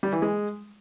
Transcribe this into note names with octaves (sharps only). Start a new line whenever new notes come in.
G3
E3
G#3